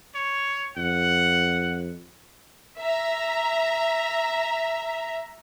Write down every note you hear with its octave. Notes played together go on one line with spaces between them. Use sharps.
C#5
F2 F#5
E5 A#5